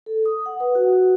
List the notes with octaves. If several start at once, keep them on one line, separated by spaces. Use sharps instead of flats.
A4
D#6
F#5
B4
F#4